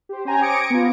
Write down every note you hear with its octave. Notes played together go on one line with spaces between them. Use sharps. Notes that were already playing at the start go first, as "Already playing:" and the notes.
G4 C5
C#4 C5 G5 G#5 A#5
D6 D#6 G#6 A#6 C#7 D7
B3 F4